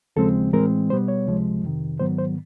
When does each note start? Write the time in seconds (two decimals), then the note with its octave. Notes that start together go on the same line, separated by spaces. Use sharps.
0.16 D#2 C#3 F3 G#3 C4 A4
0.53 A2 E3 G#3 C4 A#4
0.90 B2 G3 B3 C5
1.08 C#5
1.27 C#2 C3 F3 G#3
1.63 F2 C3 D#3
1.99 G#2 D#3 F#3 B3 C5
2.18 C5